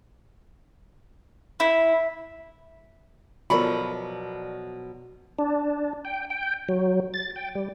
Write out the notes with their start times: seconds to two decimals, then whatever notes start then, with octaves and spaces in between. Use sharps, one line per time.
1.60 E4
3.50 B2 F3 F#3 A4 A#4 D5 B5 C#6
5.39 D4
6.05 G5
6.30 G5
6.69 F#3
7.14 A6
7.36 G5
7.55 G3